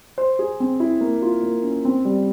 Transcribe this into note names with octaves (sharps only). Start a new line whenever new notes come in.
C5
G#4
C4
E4
A#3
F4
A#3
C#4
C4
G3